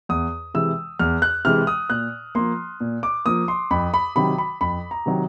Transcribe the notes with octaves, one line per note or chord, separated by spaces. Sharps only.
E2 D#6
C3 E3 G#3 E6
E2 F6
F#6
C3 E3 G#3 F6
D#6
A#2 F#6
F3 A#3 C6
A#2
D6
F3 A#3 D#6
C6
F2 B5
B5
C3 D#3 F#3 B5
B5
F2 B5
A#5
C3 D#3 F#3